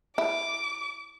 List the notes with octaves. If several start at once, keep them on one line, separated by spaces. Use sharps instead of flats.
E4 D6